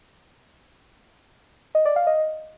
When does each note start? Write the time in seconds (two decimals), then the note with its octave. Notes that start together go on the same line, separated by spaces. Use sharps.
1.75 D#5
1.85 D5
1.96 F5
2.07 D#5